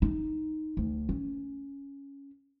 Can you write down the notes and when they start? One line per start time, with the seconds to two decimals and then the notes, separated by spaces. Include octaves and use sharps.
0.02 D#4
0.77 D2
1.09 C#4